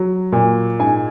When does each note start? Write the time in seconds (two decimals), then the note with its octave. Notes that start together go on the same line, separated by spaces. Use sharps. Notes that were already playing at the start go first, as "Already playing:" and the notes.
Already playing: F#3
0.32 A#2
0.79 G#2 G#5